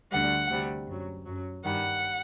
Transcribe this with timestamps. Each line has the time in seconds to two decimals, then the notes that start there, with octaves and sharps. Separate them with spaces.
0.11 D2 D3 G3 F#5
0.49 D2 C3 G3
0.86 F#2 F#3
1.25 F#2 F#3
1.63 G2 D#3 G3 F#5